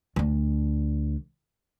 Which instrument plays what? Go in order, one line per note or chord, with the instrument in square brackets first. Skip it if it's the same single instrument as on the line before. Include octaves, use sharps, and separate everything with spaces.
[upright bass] D2 D4